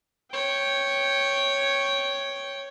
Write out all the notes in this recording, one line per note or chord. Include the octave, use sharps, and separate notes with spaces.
C#5 G5